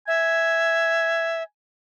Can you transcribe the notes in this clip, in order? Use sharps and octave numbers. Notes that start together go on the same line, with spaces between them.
E5 G#5